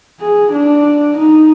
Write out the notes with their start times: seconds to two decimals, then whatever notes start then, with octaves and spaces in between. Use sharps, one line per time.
0.20 G#4
0.53 D4
1.18 D#4